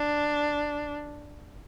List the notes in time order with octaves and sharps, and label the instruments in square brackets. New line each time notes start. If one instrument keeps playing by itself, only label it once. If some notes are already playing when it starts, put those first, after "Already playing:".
Already playing: [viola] D4